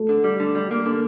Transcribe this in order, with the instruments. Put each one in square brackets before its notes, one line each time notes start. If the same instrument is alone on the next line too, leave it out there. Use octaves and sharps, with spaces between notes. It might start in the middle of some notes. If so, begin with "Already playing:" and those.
Already playing: [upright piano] A3
[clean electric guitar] D3
G3
D3
G3
A#3
D3